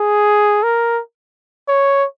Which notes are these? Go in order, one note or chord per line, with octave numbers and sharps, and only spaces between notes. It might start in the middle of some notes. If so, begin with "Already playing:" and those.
Already playing: G#4
A#4
C#5